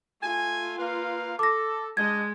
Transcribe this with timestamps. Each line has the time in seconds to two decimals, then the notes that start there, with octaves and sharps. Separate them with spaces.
0.22 A3 F4 G#5
0.79 A#3 B4 F5
1.39 A4 D6 A#6
1.97 G#3 D4 D#5 G#6